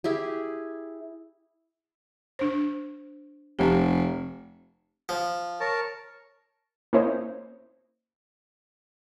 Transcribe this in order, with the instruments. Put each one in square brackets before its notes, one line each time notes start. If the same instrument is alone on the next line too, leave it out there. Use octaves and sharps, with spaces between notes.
[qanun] E4 G4 G#4
[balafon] D4 C5
[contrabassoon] F1 [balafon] G4
[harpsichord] F3
[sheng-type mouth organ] A#4 C#5 A5
[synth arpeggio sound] A#3 C#4 E4 C5 C#5 D#5